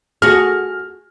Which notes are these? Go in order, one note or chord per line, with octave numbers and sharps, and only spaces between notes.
F#4 G#4 F6